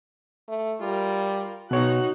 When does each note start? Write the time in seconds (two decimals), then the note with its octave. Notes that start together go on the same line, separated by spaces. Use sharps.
0.49 A3
0.81 G3 F4 A#4
1.71 B2 D#4 F#4 C#5 F#6